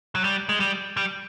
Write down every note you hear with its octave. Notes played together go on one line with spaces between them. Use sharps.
F#3
G3
G#3
G3
G3